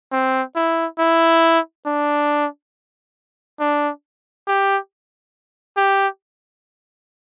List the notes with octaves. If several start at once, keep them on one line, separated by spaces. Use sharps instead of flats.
C4
E4
E4
D4
D4
G4
G4